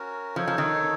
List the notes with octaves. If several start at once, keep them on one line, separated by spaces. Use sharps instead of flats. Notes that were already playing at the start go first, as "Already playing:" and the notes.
Already playing: C#4 F#4 A#4
F3 D#4 A4 C#5
F3
D#3